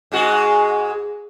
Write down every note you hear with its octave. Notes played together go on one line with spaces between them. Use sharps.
G#2 G#3 F#4